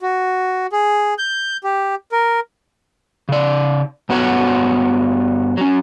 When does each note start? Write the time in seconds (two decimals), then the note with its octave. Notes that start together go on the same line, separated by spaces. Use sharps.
0.01 F#4
0.72 G#4
1.18 G6
1.64 G4
2.12 A#4
3.29 C#3 D5
4.09 G2 B3 F#4 B4 C#5 F#5
5.57 F#3 C#4